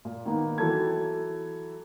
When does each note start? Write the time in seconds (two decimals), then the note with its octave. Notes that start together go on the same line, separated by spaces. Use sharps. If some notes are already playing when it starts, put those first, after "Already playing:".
0.05 A#2
0.26 D#3 A#3 B3
0.58 E3 F#3 A4 A5 G#6